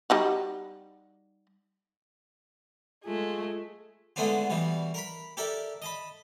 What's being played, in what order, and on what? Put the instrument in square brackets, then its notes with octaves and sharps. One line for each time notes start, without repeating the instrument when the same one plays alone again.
[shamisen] G3 D#4 F#4
[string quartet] G#3 A3 G#4 [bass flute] F4
[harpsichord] D3 G#3 A3 B3 D4 F4
B2 E3 G3
A#4 A#5 B5
G4 A4 A#4 D5 E5
D#5 A5 B5